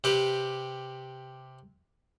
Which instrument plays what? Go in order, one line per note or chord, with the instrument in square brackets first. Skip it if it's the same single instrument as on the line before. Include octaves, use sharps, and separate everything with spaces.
[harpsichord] C3 G4 B4